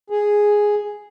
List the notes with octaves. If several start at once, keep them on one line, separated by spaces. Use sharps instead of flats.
G#4